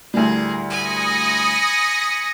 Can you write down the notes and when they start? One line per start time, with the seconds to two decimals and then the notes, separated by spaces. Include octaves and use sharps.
0.14 D2 A2 G3 G#4 A#4
0.70 G#5 B5 D#6 A#6 C#7